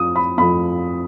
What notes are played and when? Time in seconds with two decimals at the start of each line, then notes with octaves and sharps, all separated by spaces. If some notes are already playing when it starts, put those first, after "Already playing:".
Already playing: F2 F3 D#6
0.16 B5
0.38 F2 F3 B5